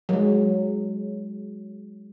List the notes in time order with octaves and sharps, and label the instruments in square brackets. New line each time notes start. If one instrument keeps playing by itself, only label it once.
[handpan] F#3 G#3